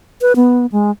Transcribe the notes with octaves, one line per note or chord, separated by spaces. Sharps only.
B4
B3
G#3